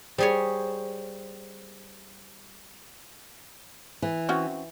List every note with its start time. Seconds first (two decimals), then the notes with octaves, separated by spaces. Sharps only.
0.18 G3 G#4 C5 C#5
4.02 E3
4.29 C4 C#4 F#4